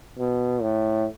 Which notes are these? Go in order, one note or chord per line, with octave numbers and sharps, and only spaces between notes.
B2
A2